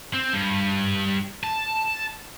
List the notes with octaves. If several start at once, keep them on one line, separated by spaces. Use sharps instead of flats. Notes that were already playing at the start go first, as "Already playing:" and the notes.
C4
G2
A5